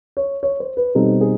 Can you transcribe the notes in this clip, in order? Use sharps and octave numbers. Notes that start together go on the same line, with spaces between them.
C#5
C#5
C5
B4
B2 G3 C4 D#4 A4
G#4